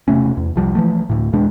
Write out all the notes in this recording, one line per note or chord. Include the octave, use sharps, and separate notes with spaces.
E1 C3 A3 C#4
E2
C2 F3 G3
E3 F3 A3
D2 A2
E2 B2 G#3 D4